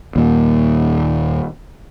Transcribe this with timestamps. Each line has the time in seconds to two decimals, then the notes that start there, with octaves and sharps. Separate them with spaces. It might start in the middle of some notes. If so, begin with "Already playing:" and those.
0.16 D#2 A#2